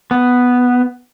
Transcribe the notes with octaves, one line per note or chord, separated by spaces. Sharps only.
B3